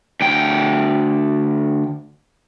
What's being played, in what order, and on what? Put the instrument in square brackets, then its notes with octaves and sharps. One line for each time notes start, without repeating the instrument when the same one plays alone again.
[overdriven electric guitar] D2 G5